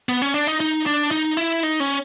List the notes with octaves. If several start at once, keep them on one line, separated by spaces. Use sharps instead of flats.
B3
C#4
D4
D#4
D#4
D4
D#4
E4
D#4
C#4